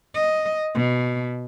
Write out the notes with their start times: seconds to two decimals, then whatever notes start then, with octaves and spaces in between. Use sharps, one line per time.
0.15 D#5
0.75 B2